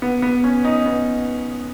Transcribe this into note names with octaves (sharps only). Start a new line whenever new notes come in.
B3
B3
C#4
D#4
B3